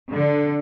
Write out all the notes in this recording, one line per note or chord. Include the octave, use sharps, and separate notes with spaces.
D3